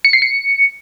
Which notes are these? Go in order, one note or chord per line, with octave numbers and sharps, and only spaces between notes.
C#7
C7
C#7